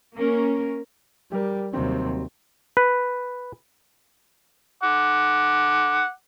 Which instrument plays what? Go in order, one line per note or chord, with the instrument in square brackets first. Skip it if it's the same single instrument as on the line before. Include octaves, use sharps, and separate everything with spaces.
[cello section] A#3 C#4 A#4
[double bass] G3 [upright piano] G4 A#4
[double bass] D#2 C3 [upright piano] F#3 G3 C4
[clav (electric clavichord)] B4
[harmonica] F#5 D6